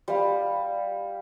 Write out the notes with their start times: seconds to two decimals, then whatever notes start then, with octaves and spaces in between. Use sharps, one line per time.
0.08 G3 F5